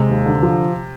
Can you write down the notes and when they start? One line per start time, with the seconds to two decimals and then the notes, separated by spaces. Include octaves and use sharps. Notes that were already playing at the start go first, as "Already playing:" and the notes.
Already playing: C3 G#3
0.10 D#2
0.26 D3
0.43 F3